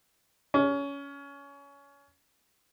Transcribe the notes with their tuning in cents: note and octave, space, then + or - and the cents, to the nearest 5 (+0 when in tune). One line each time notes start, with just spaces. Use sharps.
C#4 +20